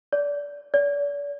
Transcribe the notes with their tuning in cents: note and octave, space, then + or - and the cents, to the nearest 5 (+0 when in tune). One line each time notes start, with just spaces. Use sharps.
D5 -25
D5 -40